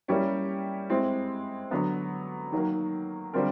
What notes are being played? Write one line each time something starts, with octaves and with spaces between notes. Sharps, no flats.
G3 A#3 C#4 E4 G4
G#3 C4 E4
D3 F#3 B3
D#3 F#3 A#3
D3 G3 C4 F4 A#4